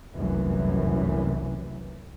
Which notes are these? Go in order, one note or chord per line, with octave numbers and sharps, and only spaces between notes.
F1 C2 F#2 A#2 E3